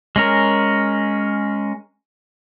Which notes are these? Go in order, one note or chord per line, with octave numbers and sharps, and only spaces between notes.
G#3 C#4 A#4